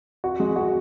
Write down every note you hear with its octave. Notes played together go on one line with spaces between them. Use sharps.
F#4
G#3
F#4